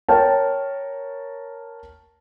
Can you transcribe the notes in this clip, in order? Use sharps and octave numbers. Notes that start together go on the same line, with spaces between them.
A#4 C#5 G5 A5